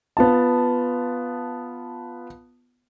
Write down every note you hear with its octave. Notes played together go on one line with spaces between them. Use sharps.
B3 F4 A5